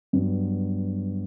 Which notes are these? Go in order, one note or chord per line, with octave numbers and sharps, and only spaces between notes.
G2 F#3 B3